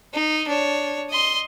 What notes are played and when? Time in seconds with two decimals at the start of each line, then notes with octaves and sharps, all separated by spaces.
0.14 D#4
0.48 D4 C#5
1.10 D#5 C6